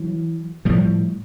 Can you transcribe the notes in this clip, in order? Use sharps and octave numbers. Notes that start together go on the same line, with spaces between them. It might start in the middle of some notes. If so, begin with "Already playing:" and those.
Already playing: E3 F#3
A2 F3 G3